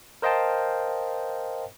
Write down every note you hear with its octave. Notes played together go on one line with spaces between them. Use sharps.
A#4 C5 D#5 F5 G5 A5